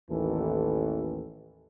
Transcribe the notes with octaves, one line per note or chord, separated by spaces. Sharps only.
A1 D#2 D#3 E3 A4